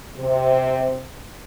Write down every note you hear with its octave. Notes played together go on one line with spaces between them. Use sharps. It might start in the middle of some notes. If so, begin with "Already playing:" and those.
C3